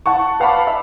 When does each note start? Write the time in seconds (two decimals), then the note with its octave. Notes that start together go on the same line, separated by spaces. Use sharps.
0.06 F#5 A5 C#6
0.40 B4 F5 F#5 A5 B5 D6
0.67 E5